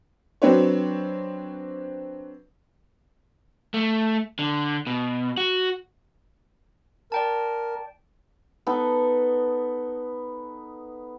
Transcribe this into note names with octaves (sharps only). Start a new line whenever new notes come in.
F#3 C4 D4 B4 C#5
A3
D3
B2
F#4
A#4 D5 G5 A5
B3 D#4 A4